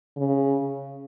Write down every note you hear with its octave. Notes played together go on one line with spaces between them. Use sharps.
C#3